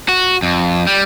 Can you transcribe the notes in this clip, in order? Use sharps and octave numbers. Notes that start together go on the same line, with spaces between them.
F#4
F2
G3